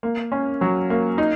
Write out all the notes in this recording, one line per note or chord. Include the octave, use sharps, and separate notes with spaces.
A#3
C#4
F#3
A#3
D#4